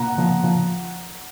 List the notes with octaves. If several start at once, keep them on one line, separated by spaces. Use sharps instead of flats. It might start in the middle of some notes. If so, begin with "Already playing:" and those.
Already playing: A#2 F#5 A#5
F3
F3